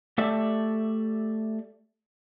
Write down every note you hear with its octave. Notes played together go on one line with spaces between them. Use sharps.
A3 G4 A4 D5 E5